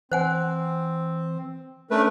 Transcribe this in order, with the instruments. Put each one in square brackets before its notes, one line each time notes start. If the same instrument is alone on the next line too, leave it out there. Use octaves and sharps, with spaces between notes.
[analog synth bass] E3 [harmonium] C4 [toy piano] C5 F#5 G#5
[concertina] A3 B4 [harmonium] C#4 D4 A#4